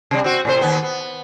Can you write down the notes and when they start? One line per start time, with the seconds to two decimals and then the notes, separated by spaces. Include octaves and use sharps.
0.11 C3 G3
0.24 C4 F#4
0.45 A2 C3 C5
0.61 D#2 B3
0.83 B3